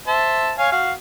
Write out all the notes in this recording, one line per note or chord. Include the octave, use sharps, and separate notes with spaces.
C5 E5 A5
C#5 F5 G#5
F#4 F5